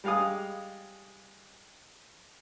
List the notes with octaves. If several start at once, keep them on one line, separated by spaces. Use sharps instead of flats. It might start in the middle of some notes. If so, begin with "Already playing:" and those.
G3 G#3 F5 G#5 D#6